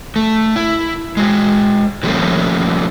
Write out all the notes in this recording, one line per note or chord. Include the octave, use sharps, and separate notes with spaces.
A3
E4
G#3 F#4
D3 F3 G3 A3 A#3 C#4